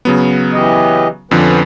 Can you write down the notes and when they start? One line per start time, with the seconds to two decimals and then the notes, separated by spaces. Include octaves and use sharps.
0.05 C#3 F#3 B3
0.53 E3 G4 D#5
1.31 F2 D3 F3 B3 C#4 B4